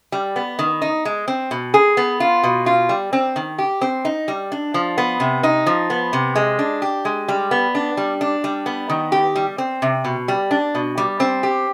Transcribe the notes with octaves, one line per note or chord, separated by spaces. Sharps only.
G3
B3
D#3
D#4
G#3
C4
B2
G#4
B3
F4
B2
F4
G3
C4
D#3
G4
C4
D#4
G3
D4
F3
B3
C3
D#4
F3
B3
C3
G#3
D4
G4
G#3
G3
B3
D4
G3
D4
G3
B3
D#3
G4
G3
C4
C3
B2
G3
D4
B2
G3
C4
G4